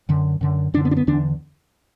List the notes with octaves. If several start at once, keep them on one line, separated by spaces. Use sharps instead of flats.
F#2 D3
F#2 D3
F#2 D3 D4
B3
D4
B3
E2 D3 D4